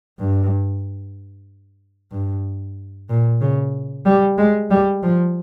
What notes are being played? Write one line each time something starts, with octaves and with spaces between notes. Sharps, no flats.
G2
G2
A#2
C#3
G3
G#3
G3
F3